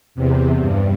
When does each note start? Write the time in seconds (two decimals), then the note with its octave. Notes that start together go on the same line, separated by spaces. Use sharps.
0.15 E2 C3
0.59 G2